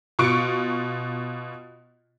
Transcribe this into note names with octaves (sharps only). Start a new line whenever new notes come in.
B2 F4 C#6 C#7 D7